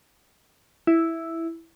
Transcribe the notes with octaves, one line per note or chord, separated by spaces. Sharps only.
E4